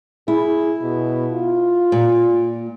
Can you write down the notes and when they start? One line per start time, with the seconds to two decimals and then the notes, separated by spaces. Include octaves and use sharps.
0.28 E4 G#4
0.81 B2
1.32 F4
1.92 A#2